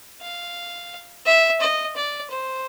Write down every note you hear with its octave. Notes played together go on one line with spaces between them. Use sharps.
F5
E5
D#5
D5
C5